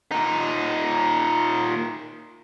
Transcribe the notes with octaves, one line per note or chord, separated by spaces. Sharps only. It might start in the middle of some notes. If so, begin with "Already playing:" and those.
A#2 D#4